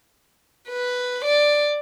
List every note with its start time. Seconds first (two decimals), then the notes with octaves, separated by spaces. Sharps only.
0.68 B4
1.25 D5